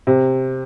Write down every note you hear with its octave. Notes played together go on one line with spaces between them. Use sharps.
C3